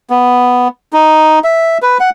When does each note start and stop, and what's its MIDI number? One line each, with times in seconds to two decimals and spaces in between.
0.10 0.68 59
0.93 1.39 63
1.44 1.78 76
1.82 1.98 71
2.00 2.10 78